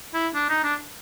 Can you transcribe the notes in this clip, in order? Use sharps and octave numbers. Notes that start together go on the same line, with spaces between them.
E4
D4
D#4
D4